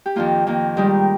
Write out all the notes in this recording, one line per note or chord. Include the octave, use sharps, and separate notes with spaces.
G4
F2 D#3 A#3 F4
F2 D#3 A#3
G#2 D#3 G3 G4